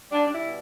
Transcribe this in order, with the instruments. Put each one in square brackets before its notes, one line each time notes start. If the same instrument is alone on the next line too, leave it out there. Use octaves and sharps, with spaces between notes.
[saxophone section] G3 D4
D4
E4
B2